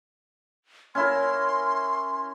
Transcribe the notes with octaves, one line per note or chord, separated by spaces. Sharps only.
C#4 E4 A#4 C6